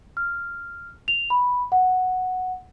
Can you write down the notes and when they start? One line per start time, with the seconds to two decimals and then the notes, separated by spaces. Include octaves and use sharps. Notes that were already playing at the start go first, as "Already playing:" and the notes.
0.17 F6
1.08 F7
1.30 B5
1.72 F#5